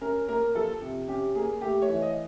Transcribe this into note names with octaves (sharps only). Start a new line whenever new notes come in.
C#4 A#4
A#3 A#4
F3 A4
C3
C#4 G4
A#3 G#4
A3 G4
C#5
E3
D#5